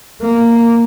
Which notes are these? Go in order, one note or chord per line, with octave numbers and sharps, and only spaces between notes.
A#3